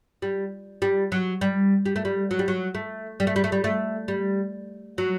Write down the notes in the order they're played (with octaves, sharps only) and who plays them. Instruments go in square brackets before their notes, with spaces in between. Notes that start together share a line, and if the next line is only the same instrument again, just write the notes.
[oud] G3
G3
F#3
G3
G3
A3
G3
F#3
G3
F#3
A3
G3
A3
G3
A3
G3
A3
G3
F#3